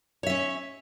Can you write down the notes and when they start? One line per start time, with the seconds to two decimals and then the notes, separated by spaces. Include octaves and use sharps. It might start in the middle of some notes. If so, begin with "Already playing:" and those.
0.23 C#5
0.26 E5
0.30 C#4